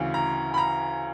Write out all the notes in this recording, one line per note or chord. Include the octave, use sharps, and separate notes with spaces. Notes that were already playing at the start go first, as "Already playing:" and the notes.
Already playing: D2 C#3 E3
A#5
B5
A#5